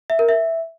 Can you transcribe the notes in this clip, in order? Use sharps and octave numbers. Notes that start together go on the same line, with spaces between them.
E5
A#4
E5